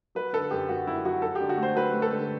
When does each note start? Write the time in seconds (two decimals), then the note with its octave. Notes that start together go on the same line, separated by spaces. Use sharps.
0.15 F#3 B4
0.33 D3 A4
0.51 F#2 G4
0.69 F#2 F#4
0.87 F#2 E4
1.05 F#3 F#4
1.22 F#3 A4
1.35 G4
1.41 D3
1.49 F#4
1.58 A3
1.63 C5
1.76 F#3 B4
1.94 A3
2.02 A4
2.12 D3